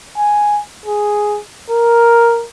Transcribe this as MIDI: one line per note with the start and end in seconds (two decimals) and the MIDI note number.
0.18 0.61 80
0.86 1.39 68
1.71 2.45 70